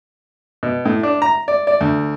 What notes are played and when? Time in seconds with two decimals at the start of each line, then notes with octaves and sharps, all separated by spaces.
0.63 B2
0.85 A2
1.03 D4
1.22 A#5
1.48 D5
1.67 D5
1.81 D2